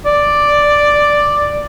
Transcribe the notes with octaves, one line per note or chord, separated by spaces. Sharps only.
D5